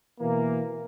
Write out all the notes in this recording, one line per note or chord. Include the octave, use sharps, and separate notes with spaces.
B2 E3 A#3